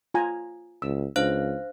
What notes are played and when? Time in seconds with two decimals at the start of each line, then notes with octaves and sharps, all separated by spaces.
0.14 F4 G#5 A#5
0.82 C#2 E6
1.16 C#2 D4 C5 F5 F#6